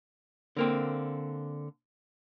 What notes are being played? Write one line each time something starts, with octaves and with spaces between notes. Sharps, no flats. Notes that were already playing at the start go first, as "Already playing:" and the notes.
D3 A#3 C4